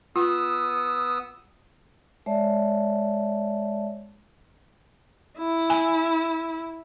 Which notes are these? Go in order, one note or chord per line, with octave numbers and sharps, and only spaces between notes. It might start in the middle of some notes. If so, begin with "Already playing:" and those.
B3 F4 D#6 E6
G#3 C#5 D5 E5 A5
E4
G#5